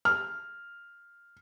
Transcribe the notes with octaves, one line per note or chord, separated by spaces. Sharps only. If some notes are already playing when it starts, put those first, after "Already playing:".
F6